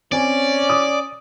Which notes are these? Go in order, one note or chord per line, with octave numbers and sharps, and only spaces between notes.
C4 C#4 D5 G#5
D6 D#6